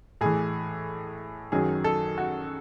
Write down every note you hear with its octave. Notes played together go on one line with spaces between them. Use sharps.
A2 E3 G#4
F#2 D#3 F#3 G#4
A4
F#4